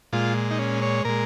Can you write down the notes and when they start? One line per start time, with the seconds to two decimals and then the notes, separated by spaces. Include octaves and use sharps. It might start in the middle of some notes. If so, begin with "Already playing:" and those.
0.13 A#2 G#3 F4
0.51 D#4
0.59 C#4
0.82 C#5
1.05 A#2 G#3 A#4